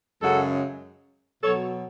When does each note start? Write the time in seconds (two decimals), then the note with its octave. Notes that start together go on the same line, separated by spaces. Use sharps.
0.21 F#2 C#3 G#3 F#4 A4
1.43 B2 F#3 A4 C#5